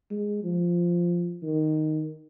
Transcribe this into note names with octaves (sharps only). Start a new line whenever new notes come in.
G#3
F3
D#3